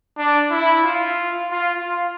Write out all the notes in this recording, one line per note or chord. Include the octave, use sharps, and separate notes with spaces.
D4
E4
F4
F4
F4